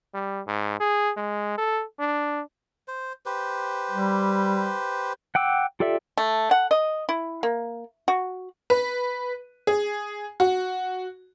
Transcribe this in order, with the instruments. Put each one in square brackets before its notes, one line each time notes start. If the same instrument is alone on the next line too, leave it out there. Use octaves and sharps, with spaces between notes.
[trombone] G3
G#2
G#4
G#3
A4
D4
[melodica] C5
G4 B4 C5
[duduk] G3
[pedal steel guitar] F#5 G5 D6 E6
F4 G4 A4 D5 E5
[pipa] A3
F#5
D#5
E4
A#3
F#4
[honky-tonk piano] B4
G#4
F#4